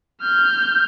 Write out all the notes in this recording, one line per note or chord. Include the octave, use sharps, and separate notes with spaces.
F6 G6